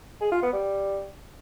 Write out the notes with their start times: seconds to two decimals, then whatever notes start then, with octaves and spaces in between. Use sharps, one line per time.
0.21 G#4
0.32 F4
0.42 B3
0.53 G3